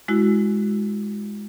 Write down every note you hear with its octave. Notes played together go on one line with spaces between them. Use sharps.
G#3 E4 F#4